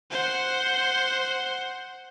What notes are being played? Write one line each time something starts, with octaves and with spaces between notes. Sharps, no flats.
C5 F#5